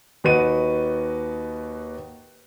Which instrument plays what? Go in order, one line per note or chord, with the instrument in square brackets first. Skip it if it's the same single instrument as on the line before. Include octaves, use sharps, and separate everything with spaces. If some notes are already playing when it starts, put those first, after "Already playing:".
[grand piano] D#2 F#4 B4 D#5 D#7